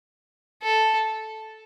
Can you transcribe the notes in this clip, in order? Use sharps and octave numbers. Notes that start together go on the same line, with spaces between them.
A4